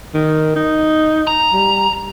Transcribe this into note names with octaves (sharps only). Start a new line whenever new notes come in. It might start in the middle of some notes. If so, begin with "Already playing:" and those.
D#3
D#4
A#5
G3